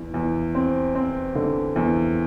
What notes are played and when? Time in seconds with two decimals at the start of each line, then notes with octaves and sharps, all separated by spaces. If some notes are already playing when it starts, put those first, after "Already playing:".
Already playing: E2
0.14 E2
0.55 C4
0.95 C4
1.35 D3
1.76 E2